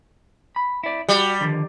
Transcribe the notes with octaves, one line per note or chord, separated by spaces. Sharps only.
B5
E4 D5
G3 F#4
D3 D#3 F3